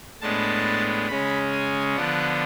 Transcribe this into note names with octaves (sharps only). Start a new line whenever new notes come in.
A2 G#3 B3 D4 A5
C#3 G#3 C#4 B5
G#5
D3 F3 B3 D4 F#5